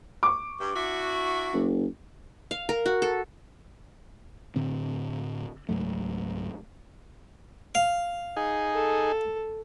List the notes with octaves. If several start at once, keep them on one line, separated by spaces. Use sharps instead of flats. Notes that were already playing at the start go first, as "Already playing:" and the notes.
C#6 D6
G2
D4 E4 F#4
F#1
F5
A#4
F#4
A4
A2 D3 C4
C#2 G#2 F#3 A3
F5
D#4 G#4
A4